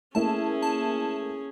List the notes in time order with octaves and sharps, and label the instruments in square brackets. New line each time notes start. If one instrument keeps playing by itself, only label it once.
[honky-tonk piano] A3 A#3 E4 [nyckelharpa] C#4 G#4 [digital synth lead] A5
[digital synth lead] A5